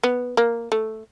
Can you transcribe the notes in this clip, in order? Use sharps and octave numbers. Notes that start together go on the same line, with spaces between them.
B3
A#3
A3